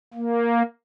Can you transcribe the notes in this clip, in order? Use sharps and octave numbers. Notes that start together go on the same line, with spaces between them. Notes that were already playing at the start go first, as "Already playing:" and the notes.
A#3